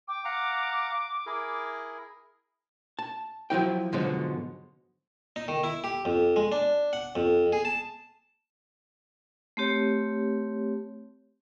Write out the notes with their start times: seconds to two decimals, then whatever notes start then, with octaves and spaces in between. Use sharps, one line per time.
0.08 G5 D6
0.25 F5 F#5 A#5
1.26 E4 G#4 A#4
2.99 A5
3.50 F3 F#3 E4 G5
3.93 G#2 B2 D3 F3 F#3 G#3
5.36 D#4
5.48 D#3
5.64 E4
5.84 G4
6.05 F2
6.36 G#3
6.52 D4
6.93 F#5
7.15 F2
7.52 G#4
7.65 A5
9.57 A3 C4 G4 C#5